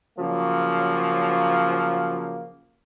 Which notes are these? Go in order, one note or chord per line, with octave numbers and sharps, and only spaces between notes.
C#3 F3 F#3 A#3